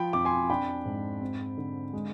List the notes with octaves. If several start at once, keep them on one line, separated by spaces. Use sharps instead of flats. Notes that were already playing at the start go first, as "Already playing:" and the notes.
Already playing: F3 G5 B5
F2 D6
G#5 C6
D4 G5 B5
G#2
C4
D3
G#3